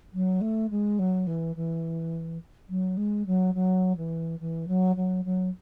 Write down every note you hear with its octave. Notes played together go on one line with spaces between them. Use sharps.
F#3
A3
G#3
F#3
E3
E3
F#3
G#3
F#3
F#3
E3
E3
F#3
F#3
F#3